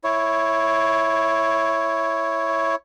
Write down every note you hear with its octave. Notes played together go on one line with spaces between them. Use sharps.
E4 C#5